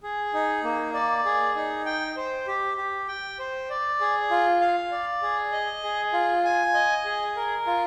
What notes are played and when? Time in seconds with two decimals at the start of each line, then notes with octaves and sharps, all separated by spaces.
0.03 G#4
0.34 D#4
0.64 A#3
0.94 D5
1.25 G#4
1.56 D#4
1.85 G5
2.17 C5
2.47 G4
2.78 G4
3.08 G5
3.39 C5
3.70 D5
4.00 G#4
4.30 F4
4.61 F5
4.92 D5
5.22 G#4
5.52 D#5
5.84 G#4
6.13 F4
6.45 G#5
6.74 D#5
7.05 G#4
7.36 A#4
7.66 F4